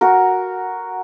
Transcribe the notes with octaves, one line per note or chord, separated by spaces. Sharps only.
F#4 A#4